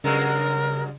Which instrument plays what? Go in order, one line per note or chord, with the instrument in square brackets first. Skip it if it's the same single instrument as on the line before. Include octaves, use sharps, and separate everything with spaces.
[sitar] G2 F#3 G#3 [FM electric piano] C#3 [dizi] A#4